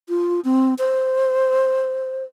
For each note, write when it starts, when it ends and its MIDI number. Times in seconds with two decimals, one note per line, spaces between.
0.09 0.40 65
0.45 0.74 60
0.78 2.24 72